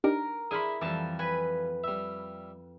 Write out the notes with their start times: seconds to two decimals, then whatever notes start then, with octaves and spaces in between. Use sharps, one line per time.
0.04 D4 D#4 G4 A#4
0.51 D4 E4 G#4 B5 C6 F6 D#7
0.81 F2 E3 G3 A5
1.19 B4 G#5 B5
1.84 G3 E5